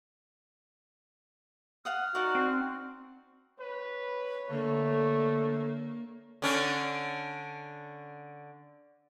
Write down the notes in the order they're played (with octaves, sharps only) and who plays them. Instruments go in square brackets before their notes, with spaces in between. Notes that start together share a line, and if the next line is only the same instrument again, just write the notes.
[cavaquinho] F5 F#5 D#6 [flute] F6
[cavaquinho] D#4 A#4 D5 [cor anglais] F#4
[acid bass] C4
[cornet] B4 [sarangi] C#5
[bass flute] D3 [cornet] A3 [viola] A#3
[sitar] D3 C#4 D4